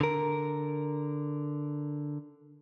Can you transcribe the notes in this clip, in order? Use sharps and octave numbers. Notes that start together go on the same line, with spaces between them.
D3 A#4